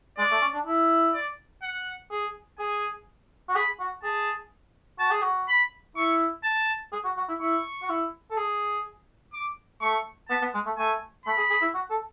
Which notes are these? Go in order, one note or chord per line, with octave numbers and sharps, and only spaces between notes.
G#3 D5
A3
C#4
D4
E4
D5
F#5
G#4
G#4 G#5
F#4
G#4 B5
F#4
G#4 A5
F#4 A5
G#4
F#4
B5
E4 C#6
A5
G#4
F#4
F#4
E4
E4 C#6
F#4
E4
A4
G#4
D6
A3 C#6
B3 A5
B3
G#3
A3
A3 G#5
A3 B5
G#4
G#4
E4
F#4
A4